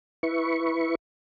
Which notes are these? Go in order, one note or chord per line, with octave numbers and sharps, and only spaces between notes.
E4 B4 C#6